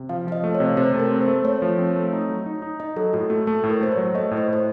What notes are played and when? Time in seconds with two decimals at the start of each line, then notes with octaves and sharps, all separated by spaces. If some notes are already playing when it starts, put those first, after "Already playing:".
Already playing: C3
0.09 F3 F5
0.27 F3 F5
0.32 D#5
0.44 A3
0.55 C#5
0.60 C3
0.77 C3 C5
0.94 A3
1.00 A#4
1.11 C4
1.22 C5
1.28 A3
1.44 A3 C#5
1.62 F3
1.78 C4
1.96 A3
2.13 D#4
2.29 F#3
2.46 D#4
2.62 D#4
2.80 D#4 D#5
2.96 F#3 A4
3.13 A2 F#4
3.30 A3 F#4
3.47 A3 A4
3.64 A2
3.70 A#4
3.81 A3 C5
3.92 C#5
3.97 F#3
4.14 A3 D#5
4.31 A2
4.37 C5
4.48 A2
4.53 C5